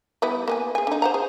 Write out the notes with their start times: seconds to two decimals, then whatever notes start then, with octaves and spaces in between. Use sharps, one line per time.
0.22 G3 B3 E4
0.48 A#3 B3 G#5
0.75 G#4 G#5
0.87 D3 D#4
1.02 C5 F#5 A#5
1.14 G#4